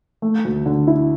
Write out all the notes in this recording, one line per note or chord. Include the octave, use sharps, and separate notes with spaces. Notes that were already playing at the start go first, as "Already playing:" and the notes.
A3
D2
D3
E4